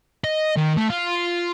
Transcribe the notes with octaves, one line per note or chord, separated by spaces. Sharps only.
D#5
D#3
A3
F4